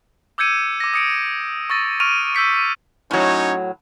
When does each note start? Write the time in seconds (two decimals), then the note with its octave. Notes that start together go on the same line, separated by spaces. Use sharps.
0.38 D6 E6 G6 G#6 C#7 D#7
0.80 D6 A#6
0.94 D#6 C#7 D7
1.70 C#6 E6 A6 A#6
2.00 C#6 F6 D7 D#7 F7
2.35 E6 G6 B6 C#7
3.11 A2 F#3 C#4 D#4 C#5